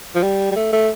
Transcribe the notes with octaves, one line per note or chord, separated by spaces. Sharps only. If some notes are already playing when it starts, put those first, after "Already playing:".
F3
G3
G3
A3
A3